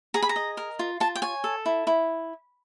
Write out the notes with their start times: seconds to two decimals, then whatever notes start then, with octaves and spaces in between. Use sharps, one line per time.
0.14 G#4 A#5
0.22 B5
0.29 A#5
0.36 D#5
0.57 A#4
0.79 F4
1.00 F4 A5
1.15 G5
1.22 C#5 G#5
1.44 A4
1.66 E4
1.87 E4